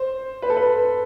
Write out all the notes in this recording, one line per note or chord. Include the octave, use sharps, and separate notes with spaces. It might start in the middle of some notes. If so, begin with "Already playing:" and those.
Already playing: C5
B4
A4
B4